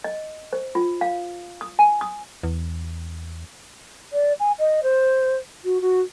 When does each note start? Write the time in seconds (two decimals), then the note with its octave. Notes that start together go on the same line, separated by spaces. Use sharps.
0.04 D#5
0.53 C5
0.75 F4
1.01 F5
1.61 D#6
1.79 G#5
2.01 D#6
2.43 E2
4.12 D5
4.39 G#5
4.58 D#5
4.82 C5
5.64 F#4
5.80 F#4